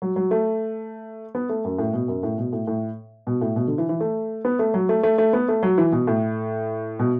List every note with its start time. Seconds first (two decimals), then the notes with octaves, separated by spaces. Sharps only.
0.02 F#3
0.16 F#3
0.31 A3
1.35 B3
1.49 A3
1.64 F#2
1.78 A2
1.93 B2
2.08 F#2
2.23 A2
2.38 B2
2.53 A2
2.67 A2
3.27 B2
3.41 A2
3.56 B2
3.67 D3
3.78 E3
3.89 E3
4.01 A3
4.45 B3
4.59 A3
4.74 F#3
4.89 A3
5.03 A3
5.18 A3
5.33 B3
5.48 A3
5.63 F#3
5.78 E3
5.92 B2
6.07 A2
6.99 B2